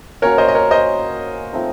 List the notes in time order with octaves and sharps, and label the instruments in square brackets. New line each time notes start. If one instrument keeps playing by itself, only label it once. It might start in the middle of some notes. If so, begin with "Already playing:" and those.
[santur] A#3 C#4 F#4 [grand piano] A#4 C#5
[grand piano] C5 D#5
D#5
A#4 C#5
C5 D#5
[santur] F3 A3 C4 D#4